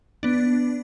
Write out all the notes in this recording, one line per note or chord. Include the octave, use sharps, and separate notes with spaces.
B3 D4